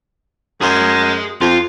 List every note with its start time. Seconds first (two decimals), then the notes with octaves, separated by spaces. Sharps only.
0.61 F#2 G#4 C6
1.41 F2 F4